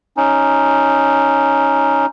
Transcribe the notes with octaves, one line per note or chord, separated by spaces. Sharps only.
C#4 D#4